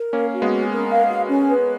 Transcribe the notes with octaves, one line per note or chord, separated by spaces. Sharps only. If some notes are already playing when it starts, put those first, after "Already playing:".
Already playing: A#4
A#3 C#4 F5
F#4
G#3 B3
C#4
A#4
F5
F#4
C#4
B4